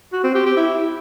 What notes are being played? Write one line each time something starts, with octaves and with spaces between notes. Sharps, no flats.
F#4
C4
G4
G4
E4